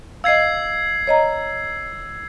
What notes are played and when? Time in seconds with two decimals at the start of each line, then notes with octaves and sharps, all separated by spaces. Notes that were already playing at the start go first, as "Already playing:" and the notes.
0.24 D#5 F5 E6 G#6 C7
1.07 C#5 D#5 A#5